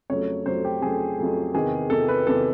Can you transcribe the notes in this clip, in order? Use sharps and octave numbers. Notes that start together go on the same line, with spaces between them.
F2 C#3 F#3 A3 C#5
F2 C#3 F#3 A3 C5
G4
F2 C#3 F#3 A3 G#4
F2 C#3 F#3 A3
E2 C3 D#3 G#4
E2 C3 D#3 A4
B4
E2 C3 D#3 A4